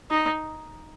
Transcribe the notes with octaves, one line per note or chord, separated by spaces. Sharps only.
D#4